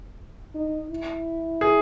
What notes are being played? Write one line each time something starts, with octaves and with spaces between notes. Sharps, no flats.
D#4
E4
G#4